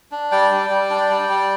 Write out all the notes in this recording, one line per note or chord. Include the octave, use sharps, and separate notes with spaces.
D4
G3 D5 G5
G3
G3
D4
G3
G3